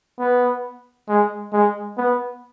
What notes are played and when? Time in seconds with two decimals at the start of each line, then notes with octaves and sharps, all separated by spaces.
0.19 B3
1.09 G#3
1.53 G#3
1.97 B3